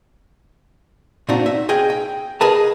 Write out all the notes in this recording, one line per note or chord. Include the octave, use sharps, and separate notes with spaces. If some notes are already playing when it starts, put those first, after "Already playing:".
A#2 C4 D4 D#4 F#4
E5
G#4 D#5 F5 G5
G5
G#4 A#4 B4 D#5 A5